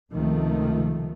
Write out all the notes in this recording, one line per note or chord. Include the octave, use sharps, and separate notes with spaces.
C#2 C3 D#3 F3 A3